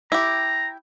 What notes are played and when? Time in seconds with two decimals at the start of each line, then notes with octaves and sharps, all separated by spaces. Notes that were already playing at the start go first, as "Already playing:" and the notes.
0.12 E4 G4 A#5